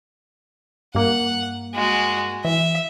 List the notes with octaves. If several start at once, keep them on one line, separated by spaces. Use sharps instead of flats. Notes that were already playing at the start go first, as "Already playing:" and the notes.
G2 A#3 F#5
G#3 F#4
E3 E5